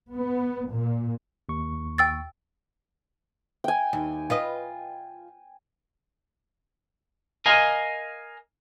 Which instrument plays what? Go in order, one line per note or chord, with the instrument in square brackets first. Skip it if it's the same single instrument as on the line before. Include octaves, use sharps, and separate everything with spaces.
[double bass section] B3
A#2
[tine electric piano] D#2 C#6
[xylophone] G5 E6 A6
[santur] G5 G#5
[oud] D#2
F4 B4 D#5
[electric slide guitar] A#4 D#5 F5 G#5